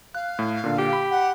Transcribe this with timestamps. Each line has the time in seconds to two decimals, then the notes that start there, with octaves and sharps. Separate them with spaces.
0.15 F5 F#6
0.39 A2
0.64 A#2 D3
0.78 G4
0.93 B5
1.11 F#5